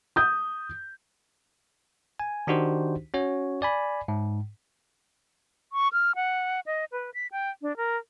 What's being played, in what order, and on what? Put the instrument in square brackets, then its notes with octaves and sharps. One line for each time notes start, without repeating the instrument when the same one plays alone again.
[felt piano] D#6 G6
[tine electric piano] G#5
D#3 D4 D#4 F#4 G4 C5
C#4 F#4 C#5
D5 G#5 B5
G#2
[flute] C#6
F6
F#5
D#5
B4
B6
G5
D4
A#4